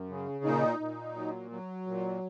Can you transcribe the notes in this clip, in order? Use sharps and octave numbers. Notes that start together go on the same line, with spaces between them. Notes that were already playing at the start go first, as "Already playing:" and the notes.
Already playing: F#2
C#3
A#2 D#4
A#2
F#3
F#3
A#2